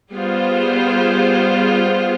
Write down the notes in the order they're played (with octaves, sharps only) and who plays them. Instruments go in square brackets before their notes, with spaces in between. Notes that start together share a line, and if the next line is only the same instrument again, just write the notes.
[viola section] G3 B3 F4 G#4 C5